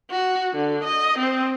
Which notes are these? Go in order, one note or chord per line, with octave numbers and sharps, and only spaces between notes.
F#4
D3
D#5
C4